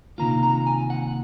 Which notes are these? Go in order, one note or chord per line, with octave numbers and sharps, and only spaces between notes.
C3 D#3 A#3 F4 A#5
A#5
G#5
F#5